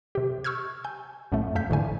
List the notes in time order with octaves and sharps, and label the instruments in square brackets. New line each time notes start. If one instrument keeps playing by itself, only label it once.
[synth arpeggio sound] C3 G4
C#6 E6 F6 G6 G#6
G#5 G6
B1 F#2 A2 A3
F2 A3 E5 F5 G6 B6
A1 A2 D3 G#5